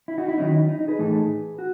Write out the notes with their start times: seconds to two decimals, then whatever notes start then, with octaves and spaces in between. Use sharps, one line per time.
0.08 E4
0.18 D#4 F#4
0.28 E4
0.38 D#3 F#3 C#4 D#4
0.53 E4
0.68 D#4
0.79 D#4
0.88 G#4 B4
0.99 A2 E3 A3 D#4
1.59 F#4